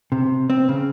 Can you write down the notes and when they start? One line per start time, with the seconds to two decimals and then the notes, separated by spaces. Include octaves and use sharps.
0.12 C3
0.50 C4
0.69 C#3